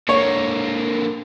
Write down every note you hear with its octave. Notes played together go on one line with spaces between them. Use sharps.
D3 A#3 C#5